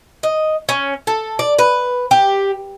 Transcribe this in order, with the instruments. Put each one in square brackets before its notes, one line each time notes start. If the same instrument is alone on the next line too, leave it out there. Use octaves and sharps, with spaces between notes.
[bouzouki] D#5
C#4
A4
D5
B4
G4